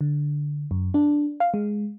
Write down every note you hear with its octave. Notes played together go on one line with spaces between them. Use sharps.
D3
F#2
D4
F5
G#3